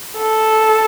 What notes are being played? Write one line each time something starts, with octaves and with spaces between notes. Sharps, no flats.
A4